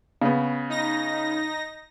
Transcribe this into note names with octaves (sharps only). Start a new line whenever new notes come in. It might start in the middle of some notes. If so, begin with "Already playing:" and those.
C#3 B3
D#4 A#6